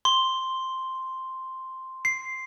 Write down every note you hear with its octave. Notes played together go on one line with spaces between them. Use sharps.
C6
C7